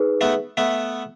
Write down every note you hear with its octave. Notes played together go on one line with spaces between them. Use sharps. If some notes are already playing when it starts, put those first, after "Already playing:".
Already playing: D#4 G#4 B4
A3 B3
A3 B3